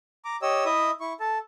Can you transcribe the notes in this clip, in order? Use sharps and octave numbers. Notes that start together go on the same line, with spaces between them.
A#5 D6
G4 C#5 D#5 E6
E4 D#5 E5 D#6
E4 C#6
A4 A5